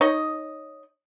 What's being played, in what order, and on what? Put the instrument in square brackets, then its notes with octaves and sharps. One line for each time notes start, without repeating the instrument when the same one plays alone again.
[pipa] D#4 C#5 D#5